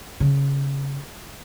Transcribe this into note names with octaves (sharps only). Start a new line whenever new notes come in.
C#3